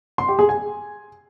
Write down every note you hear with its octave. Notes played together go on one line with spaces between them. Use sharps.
C6
G4
G#4
G#5